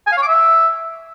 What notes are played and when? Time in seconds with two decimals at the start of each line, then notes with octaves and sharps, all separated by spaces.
0.07 G#5
0.12 F5
0.17 C#5
0.22 D6
0.28 E5